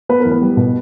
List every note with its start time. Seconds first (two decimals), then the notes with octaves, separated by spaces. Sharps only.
0.09 B3 B4
0.20 A#4
0.25 E2
0.31 B3 B4
0.41 G3
0.57 B2